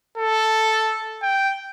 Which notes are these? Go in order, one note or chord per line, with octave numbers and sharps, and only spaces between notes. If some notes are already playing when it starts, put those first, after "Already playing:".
A4
G5